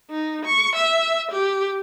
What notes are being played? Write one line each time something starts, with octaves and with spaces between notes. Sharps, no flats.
D#4
C#6
E5
G4